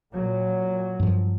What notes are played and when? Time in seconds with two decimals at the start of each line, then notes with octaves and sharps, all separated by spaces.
0.13 A#2 F#3
1.00 G2 F3